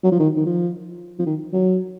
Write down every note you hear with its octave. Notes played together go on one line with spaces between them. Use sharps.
F#3
F3
D#3
D#3
F3
F3
D#3
F#3